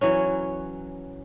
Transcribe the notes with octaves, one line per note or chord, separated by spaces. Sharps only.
E3 F#3 C#4